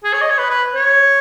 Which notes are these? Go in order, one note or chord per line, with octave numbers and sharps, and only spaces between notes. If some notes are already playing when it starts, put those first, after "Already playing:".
G#4
C#5
D#5
C#5
B4
B4
C#5